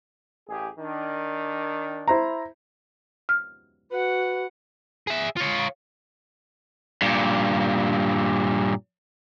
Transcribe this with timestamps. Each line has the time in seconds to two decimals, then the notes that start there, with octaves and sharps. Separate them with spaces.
0.48 A1 G4 G#4
0.78 D#3 D4
2.08 E4 C5 A#5
3.29 F6
3.91 F#4 B4 F#5
5.07 G#4 E5
5.37 F4 C#5
7.02 G2 A#2